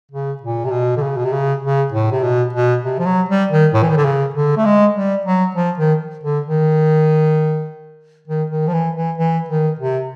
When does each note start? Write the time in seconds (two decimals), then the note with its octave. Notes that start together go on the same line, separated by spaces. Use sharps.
0.11 C#3
0.42 A#2
0.65 C3
0.71 B2
0.97 D3
1.02 C#3
1.17 B2
1.25 C3
1.32 C#3
1.63 C#3
1.92 A2
2.11 C3
2.23 B2
2.53 B2
2.83 C3
2.99 F3
3.06 F#3
3.29 G3
3.51 D#3
3.74 A2
3.83 E3
3.90 D#3
3.97 D3
4.05 C#3
4.34 D3
4.57 A3
4.65 G#3
4.95 G3
5.25 F#3
5.55 F3
5.78 D#3
6.23 D3
6.46 D#3
8.28 D#3
8.50 D#3
8.67 F3
8.73 E3
8.96 E3
9.18 E3
9.49 D#3
9.79 C3